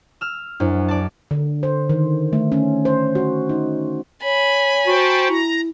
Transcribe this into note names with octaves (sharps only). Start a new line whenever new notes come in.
E6 F6
F#2 D4 E4 C5
D5 A5
D3
C5
D#3
A3
C#4
C5
F#4
D#4
C#5 G#5 B5
F#4 C5 G5 A5
E4 A#5